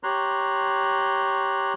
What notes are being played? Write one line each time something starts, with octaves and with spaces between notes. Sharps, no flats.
G4 C#5 A#5 C6 F#6